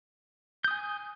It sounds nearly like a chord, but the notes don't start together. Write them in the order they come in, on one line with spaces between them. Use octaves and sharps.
G6 D#6 G#5